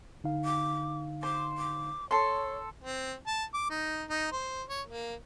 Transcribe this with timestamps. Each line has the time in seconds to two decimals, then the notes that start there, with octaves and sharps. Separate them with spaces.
0.24 D3 D#4 F5
0.45 D6
1.23 C5 D6
1.58 D6
2.11 A4 C#5 C6
2.84 C4
3.27 A5
3.54 D6
3.70 D#4
4.10 D#4
4.32 C5
4.69 C#5
4.87 A#3